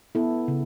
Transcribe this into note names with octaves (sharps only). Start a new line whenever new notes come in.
B3 E4 A4
C#3